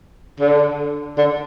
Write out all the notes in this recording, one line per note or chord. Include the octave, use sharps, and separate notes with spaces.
D3
D3